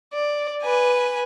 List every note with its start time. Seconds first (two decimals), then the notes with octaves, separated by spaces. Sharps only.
0.13 D5
0.62 B4 G#5